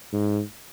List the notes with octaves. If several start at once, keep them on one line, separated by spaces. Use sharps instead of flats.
G#2